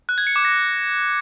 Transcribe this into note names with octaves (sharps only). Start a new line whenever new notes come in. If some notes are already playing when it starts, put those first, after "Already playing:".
F#6
G#6
C#7
D6
A#6